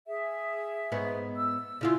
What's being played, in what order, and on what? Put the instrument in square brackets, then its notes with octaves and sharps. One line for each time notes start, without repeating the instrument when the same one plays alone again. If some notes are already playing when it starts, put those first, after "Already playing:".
[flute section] G#4 E5
[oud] G#2 B3 C#5
[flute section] E6
[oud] C#3 E4 F4